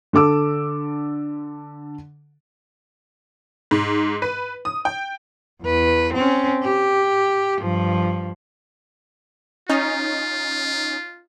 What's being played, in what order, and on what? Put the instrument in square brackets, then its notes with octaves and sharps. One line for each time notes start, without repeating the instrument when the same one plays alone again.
[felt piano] D3 A4 D6 E6
[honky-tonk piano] G#2
B4
D#6
G5
[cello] E2 B4
C4 C#4
G4
G2 F3
[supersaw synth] C#4 D#4 [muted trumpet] F4